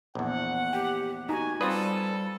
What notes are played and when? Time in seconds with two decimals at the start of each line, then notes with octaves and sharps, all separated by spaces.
0.15 A#1 E2 F#5
0.73 G4 G5
1.29 D#4 F#4 G#5 A#5
1.61 G3 C4 F4 A4 B4 D5 D#6